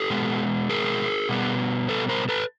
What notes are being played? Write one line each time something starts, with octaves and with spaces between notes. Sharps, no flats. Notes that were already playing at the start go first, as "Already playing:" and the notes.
Already playing: G4 A4
B2 G#3 B3
G#4 A#4
B2 G3 B3
A4 B4
A#4 C5
A4 B4